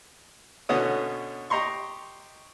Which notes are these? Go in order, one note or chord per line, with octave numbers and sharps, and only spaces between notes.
B2 D3 B3 C#4 D#6
G4 D#5 A#5 C6 C#6